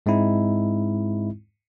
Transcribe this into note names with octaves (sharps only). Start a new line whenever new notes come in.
G#2 G#3 C4 D#4 E4